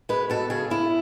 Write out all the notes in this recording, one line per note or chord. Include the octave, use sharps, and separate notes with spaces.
G#3 B4
B2 A4
C#3 G#4
C#3 E4